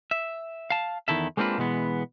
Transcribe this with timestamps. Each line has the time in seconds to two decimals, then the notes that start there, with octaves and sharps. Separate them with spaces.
0.11 E5
0.70 F5 A5
1.08 E2 D#3 E4 A4 E5
1.37 G#3 A#3 C4 D4 F4 B4
1.58 B2 E3 G#3 B3